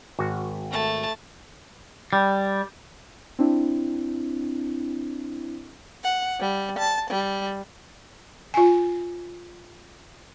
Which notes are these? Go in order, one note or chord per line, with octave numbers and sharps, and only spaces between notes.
G#1 F#4
A3 A5
G3
C4 D4 E4
F#5
G3
A5
G3
F4 G#5